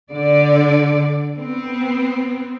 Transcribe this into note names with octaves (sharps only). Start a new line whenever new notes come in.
D3 D5
B3 C4